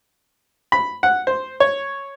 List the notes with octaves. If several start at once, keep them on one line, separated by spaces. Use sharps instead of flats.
B5
F#5
C5
C#5